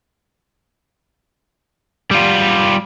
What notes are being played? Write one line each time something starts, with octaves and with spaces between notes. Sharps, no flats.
G3 F4